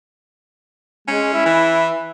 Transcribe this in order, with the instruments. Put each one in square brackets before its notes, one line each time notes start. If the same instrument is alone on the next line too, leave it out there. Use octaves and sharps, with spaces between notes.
[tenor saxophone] G#3 [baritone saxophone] C#4
[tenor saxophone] E4
[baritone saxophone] E3